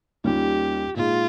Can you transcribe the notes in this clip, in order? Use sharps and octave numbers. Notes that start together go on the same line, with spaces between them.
D#2 D#3 G3 C#4 F4 G4
A#2 G#3 D#4 F4 G#4